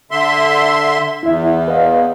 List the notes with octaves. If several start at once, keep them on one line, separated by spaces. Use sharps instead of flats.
D3 E5 C6
E2 E4 E5
B4 D#5 F5